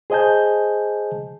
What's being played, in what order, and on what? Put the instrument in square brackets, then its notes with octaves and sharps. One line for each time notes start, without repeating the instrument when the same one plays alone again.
[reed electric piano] G#4 C5 D#5 G#5 A5 G6